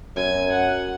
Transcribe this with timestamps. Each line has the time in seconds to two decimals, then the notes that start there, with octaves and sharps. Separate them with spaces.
0.16 F#2 G#5
0.51 F#5